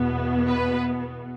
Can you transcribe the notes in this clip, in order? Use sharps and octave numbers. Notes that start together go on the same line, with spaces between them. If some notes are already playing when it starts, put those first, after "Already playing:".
Already playing: E2 B2 B3
B4